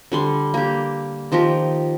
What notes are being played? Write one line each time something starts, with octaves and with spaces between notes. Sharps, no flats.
D3 G3 C6
A#3 G4
D#3 F3 G4 A#4